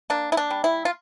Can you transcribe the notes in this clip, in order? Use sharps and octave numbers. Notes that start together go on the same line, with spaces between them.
A#3 D4
E4
D4
G3
E4
F4